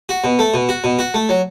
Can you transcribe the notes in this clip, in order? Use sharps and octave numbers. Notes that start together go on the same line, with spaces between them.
F#4
B2
A3
B2
F#4
B2
F#4
A3
F#3